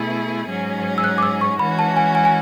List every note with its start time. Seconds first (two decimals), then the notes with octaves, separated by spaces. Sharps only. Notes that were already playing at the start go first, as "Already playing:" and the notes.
Already playing: B2 A3 E4 G#4
0.49 G#2 F#3 C#4 G#4
0.98 E6
1.04 F#6
1.18 D6
1.23 E6
1.41 C#6
1.59 E3 G#3 C#4 F#4 B5
1.79 A5
1.97 G#5
2.15 G#5
2.25 G#5